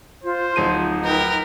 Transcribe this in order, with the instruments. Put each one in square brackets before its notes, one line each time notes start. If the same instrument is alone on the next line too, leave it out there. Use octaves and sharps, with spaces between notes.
[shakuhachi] F4 [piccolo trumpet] C5
[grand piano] D1 F3 D#7 [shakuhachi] D#4
[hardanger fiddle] A#4 G5 [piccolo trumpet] B4